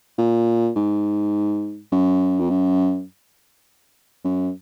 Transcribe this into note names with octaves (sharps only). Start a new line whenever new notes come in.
A#2
G#2
F#2
F2
F#2
F#2